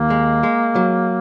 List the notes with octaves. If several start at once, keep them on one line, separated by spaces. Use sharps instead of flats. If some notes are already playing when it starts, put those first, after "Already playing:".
Already playing: D#2 A#3
G#3
G#3
F#3